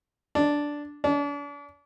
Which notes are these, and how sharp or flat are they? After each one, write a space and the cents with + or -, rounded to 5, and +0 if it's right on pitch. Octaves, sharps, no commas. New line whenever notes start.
D4 -5
D4 -40